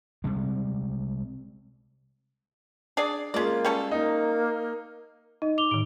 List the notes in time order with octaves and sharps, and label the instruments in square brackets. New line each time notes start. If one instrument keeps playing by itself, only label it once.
[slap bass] C3 G3 G#3
[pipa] D4 G#4 D5
[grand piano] G#3 F4 [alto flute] A#3 [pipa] C#4 D5
[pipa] G3 C#4 A4
[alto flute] A#3 [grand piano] D#4
[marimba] D#4 [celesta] D#5
[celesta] D6 F7 G7
[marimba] A2 D#3 [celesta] D7